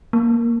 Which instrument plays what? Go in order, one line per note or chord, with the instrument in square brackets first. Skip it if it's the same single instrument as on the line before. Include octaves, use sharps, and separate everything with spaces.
[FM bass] A#3